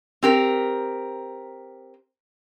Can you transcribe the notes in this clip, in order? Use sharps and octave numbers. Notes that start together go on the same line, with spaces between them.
C4 G4 A#4